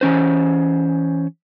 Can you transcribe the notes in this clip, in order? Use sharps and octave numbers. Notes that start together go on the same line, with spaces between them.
E3 C#4 C5